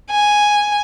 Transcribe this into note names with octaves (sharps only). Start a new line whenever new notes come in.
G#5